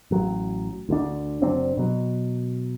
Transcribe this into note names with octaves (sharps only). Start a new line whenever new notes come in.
A1 F#3
D2 D3 D4
F#1 F#3 C4 D4
B2 F#3